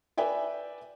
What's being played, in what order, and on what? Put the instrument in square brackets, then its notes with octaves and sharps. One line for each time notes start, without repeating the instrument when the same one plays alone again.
[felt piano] B4 D5 E5 G5 G#5